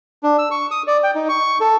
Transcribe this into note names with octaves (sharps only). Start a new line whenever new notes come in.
D4
E6
C#6
D#6
D5
G5
D#4
C#6
A4